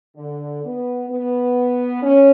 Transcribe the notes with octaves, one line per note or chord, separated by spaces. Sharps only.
D3
B3
B3
C#4